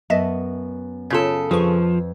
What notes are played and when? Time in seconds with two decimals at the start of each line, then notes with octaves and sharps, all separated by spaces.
0.10 F#2 B3 D#5 E5 A5
1.10 C#3 F4 A4 C#5
1.51 F2 F3 G#4 B4 C5 C#6